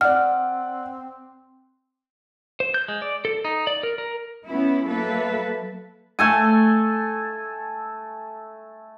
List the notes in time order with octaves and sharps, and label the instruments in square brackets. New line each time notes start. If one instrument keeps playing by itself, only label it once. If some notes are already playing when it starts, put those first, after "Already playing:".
[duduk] C4 [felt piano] D5 F#5 [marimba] F6
[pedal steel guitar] C5
G6
G#3
D5
A4
D#4
D5
A#4
A#4
[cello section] B3 C#4 E4
F#3 A#3 A4 B4 E5
[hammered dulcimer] A3 A4 G#5